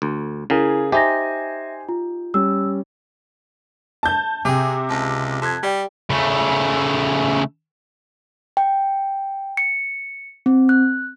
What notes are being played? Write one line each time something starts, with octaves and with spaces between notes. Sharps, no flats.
D2
C#3 E4 G#4 A#4 G#5
D#4 G4 C5 E5 G#5 A#6
F4
G3 C#4 E6
A5 G6
C3 G#4 G5 D6
C#2 A5
F2 A5 F#6 G#6
G3 G4 D5 G5
C#3 A3
G5
C#7
C4
F#6